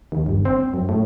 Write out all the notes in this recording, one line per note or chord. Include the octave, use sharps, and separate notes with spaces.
D#2
G1
C4
F#2
A2